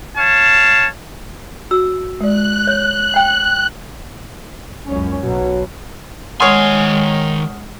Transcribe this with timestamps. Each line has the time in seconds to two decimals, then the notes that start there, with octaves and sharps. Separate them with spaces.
0.17 C#5 F5 A5
1.71 F#4 E6
2.21 G#3 D5 F#6
2.67 C#5
3.14 F#5 G5
4.89 C#2 F#2 C#4
5.22 B1 B2 F#3
6.40 D#3 G#3 C#5 F#5 G#5 C6 D#6 F6